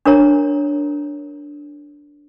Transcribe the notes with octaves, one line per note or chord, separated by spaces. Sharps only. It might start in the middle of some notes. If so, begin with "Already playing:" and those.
D4 A#4 C#5 A#5